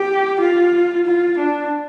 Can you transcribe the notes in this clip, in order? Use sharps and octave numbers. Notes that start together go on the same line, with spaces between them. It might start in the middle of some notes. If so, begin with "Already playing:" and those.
Already playing: G4
F4
F4
D4